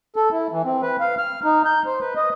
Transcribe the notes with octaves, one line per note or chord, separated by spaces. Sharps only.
A4
E4
E3
C4
B4
F5
F6
D#4
G6
C5
B4
D#5